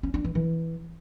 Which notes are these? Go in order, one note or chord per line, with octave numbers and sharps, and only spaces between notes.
C#4
D4
E3
E3